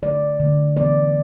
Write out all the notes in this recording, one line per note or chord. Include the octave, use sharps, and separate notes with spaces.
D3 A3 D5
D3 A3
E3 B3 D5